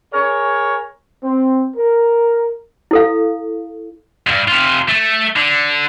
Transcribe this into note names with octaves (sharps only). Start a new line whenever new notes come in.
G#4 A#4 C#5
C4
A#4
E4 A4 F5
D2 G2
C3 F4
A3
D3